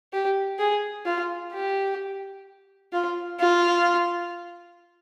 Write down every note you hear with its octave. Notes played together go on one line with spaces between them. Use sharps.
G4
G#4
F4
G4
F4
F4